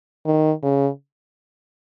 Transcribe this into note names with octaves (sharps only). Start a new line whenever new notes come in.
D#3
C#3